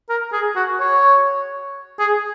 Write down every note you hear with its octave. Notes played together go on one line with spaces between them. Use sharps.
A#4
G#4
F#4
C#5
G#4